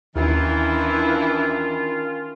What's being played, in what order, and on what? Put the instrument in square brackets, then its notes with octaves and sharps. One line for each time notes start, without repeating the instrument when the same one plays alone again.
[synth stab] D#2 [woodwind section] D#3 C#4 F4 [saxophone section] E3 [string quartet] D4 E4